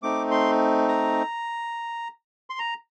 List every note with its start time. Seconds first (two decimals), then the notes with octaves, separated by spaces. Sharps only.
0.03 A3 C4 D#4 D6
0.31 C6
0.88 A#5
2.50 C6
2.59 A#5